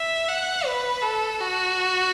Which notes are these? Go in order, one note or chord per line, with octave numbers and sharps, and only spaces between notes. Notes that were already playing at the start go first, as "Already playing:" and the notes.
Already playing: E5
F#5
B4
A4
F#4